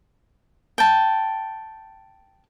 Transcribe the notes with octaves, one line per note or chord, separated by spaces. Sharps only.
G5 A5